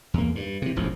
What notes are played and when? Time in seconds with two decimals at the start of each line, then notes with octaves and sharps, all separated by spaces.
0.14 E2 A#3
0.35 G2
0.62 C3 E3
0.76 E1 A1 D2 F3